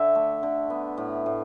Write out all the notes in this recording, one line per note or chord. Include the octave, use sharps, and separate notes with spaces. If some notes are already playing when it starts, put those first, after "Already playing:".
Already playing: D3 E5
A3
D3
B3
A2
A2